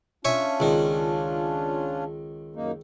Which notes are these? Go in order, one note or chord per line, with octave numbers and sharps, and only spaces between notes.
C#4 D4 F4 C#5 E5 G#5
C#2 D#3
F#2 A#3 D#4